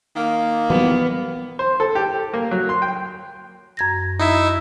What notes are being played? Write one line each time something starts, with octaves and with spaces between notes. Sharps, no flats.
D#3 A#3
E3 F#3 G3 B3
C5
A4
G4
A#3
F#3
C6
G5
F#2 G#6 A#6
D#4 E4 E5